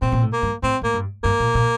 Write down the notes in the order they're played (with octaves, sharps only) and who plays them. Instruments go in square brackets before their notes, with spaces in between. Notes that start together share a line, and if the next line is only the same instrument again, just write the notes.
[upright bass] A#2 [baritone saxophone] C4
[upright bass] A#2
A2
[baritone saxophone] A#3
[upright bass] G2
[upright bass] A2 [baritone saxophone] C4
[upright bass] A2 [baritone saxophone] A#3
[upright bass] G2
[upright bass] G2 [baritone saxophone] A#3
[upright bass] A#2
A#2